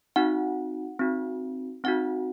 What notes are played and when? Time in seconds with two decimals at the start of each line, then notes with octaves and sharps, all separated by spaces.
0.16 C4 D#4 F#4 F#5
0.99 C4 D#4 F#4
1.84 C4 D#4 F#4 F#5